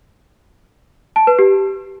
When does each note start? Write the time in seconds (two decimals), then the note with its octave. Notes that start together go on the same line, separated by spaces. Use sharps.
1.16 A5
1.27 B4
1.39 G4